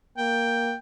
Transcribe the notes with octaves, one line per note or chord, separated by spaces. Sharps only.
A#3 G5